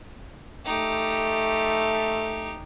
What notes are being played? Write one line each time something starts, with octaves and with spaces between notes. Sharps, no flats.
A3 D#4 G4